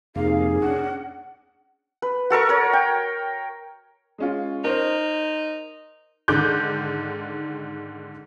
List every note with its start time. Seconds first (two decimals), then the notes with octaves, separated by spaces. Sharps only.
0.16 F2 C3 A#3 D#4 G#4 F5
0.62 C#4 D4 F#5
2.02 B4
2.30 F#4 A4 A#4 C#6
2.49 A#4 C#5
2.73 G5
4.18 G#3 C#4 F4
4.64 D#4 A#4 C5
6.28 G#2 D3 D#3 D6 F#6 G6